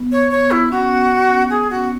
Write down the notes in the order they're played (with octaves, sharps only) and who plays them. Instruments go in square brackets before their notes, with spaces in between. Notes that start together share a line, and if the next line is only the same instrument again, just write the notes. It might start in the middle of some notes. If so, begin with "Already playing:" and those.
Already playing: [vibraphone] B3
[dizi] C#5
C#5
E4
[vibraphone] C#4 [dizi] F#4
[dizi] G#4
F#4